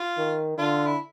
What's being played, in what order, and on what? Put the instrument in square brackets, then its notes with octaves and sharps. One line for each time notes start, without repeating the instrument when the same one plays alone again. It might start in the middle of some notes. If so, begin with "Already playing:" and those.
Already playing: [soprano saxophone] F4
[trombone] D#3
[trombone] D3 [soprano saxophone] F4
[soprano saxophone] E4